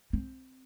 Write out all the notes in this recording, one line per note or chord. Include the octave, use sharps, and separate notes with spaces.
C4